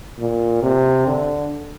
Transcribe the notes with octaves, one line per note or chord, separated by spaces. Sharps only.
A#2
C3
D3